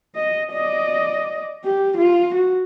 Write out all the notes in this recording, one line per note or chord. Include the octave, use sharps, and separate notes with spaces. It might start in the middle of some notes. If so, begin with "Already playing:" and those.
D#5
D5 D#5
G4
F4
F#4